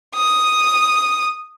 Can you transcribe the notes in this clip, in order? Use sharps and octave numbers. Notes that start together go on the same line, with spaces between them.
D#6